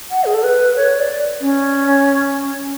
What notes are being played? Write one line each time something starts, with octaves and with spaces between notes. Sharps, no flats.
F#5
G#4
A4
B4
C#5
D5
C#4